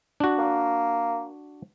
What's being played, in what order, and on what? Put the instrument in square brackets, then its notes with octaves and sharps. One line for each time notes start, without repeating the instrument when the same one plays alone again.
[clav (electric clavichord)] D4 F#4
[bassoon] A#3